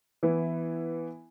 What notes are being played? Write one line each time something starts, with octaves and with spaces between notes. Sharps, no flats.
E3 B3 E4